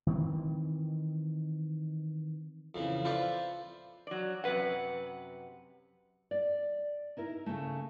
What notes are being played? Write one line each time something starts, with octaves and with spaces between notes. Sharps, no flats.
D#3 E3 C4
F2 C#3 E3
F4 A4 B4 C5 D5 E5
F#3 D5
F#2 C3 B4 F#5
D5
D#4 E4 A#4
C#3 A3